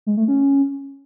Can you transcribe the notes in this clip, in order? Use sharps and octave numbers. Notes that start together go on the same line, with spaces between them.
G#3
A3
C#4